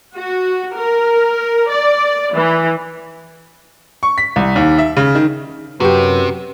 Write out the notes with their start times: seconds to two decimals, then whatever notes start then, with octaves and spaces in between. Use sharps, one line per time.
0.16 F#4
0.76 A#4
1.69 D5
2.33 E3
4.03 C#6
4.18 B6
4.36 C2
4.56 D#2
4.78 E5
4.97 C#3
5.15 D#3
5.80 F#2 C3 F#4 G4 B4